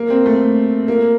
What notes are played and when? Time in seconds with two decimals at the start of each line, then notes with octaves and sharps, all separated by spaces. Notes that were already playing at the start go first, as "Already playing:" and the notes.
Already playing: A#3
0.10 C4
0.26 A3
0.88 A#3